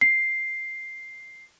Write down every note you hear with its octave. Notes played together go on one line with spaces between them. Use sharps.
C7